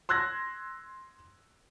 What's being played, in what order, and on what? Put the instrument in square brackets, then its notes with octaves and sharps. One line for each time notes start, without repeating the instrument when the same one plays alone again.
[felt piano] C6 E6 F#6 G#6 A#6